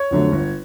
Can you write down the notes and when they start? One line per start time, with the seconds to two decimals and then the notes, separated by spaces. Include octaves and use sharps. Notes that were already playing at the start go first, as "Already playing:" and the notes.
Already playing: C#5
0.11 F2 D3 F#3 A3
0.32 G1